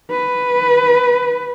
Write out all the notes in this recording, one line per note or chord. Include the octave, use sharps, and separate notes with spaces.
B4